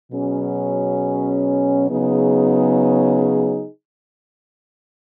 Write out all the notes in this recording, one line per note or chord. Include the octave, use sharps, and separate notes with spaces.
B2 F#3 C#4 G#4
C#3 F#3 B3 D#4 G#4